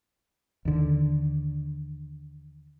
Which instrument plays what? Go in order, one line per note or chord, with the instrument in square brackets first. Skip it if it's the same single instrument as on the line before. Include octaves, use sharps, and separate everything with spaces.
[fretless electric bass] D#2 D3